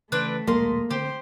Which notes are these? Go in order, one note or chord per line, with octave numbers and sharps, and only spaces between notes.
C#3 E3 A3 C4 D4 B4
D#1 B1 G#3 A#3 D#5 C6
D3 C4 G4 C5